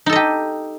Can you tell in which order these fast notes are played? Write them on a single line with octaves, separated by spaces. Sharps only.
D#4 A4 D#5 G4